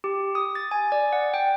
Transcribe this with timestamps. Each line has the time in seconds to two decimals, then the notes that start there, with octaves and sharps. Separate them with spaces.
0.04 G4
0.35 D#6
0.55 A6
0.71 G#5
0.92 D5
1.13 F#5
1.34 G5